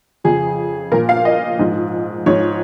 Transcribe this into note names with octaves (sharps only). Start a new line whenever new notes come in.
F2 C#3 F3 G#4
A#2 F3 A#4
F5
D#5
G#2 F3
G#2 F3 C#5